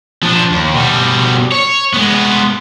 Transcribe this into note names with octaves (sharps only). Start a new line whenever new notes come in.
F3 D4
D#2
B2 G3
C#5
G#3 B3